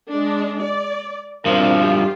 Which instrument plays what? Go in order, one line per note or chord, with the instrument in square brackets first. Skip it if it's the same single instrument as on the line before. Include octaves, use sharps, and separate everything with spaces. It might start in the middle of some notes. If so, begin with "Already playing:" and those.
[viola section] G#3 D4
D5
[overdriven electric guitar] G2 F3 [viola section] C4 D4 A#4
[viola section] F4 G4